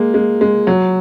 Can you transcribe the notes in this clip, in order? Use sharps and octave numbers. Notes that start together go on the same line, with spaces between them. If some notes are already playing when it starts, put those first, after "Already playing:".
Already playing: G#3 A#3
G#3
G#3
F#3